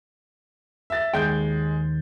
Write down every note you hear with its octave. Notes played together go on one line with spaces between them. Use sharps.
E5 A6
D#2 G#3 G5 G6